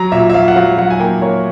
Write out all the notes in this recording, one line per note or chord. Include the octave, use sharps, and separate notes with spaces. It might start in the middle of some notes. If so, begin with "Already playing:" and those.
Already playing: F#3 A#5
A#2 E5
E5
F#3 F5
F#5
F#3 F5
F#3 F#5
G#5
A#3 G5
A#3 C#5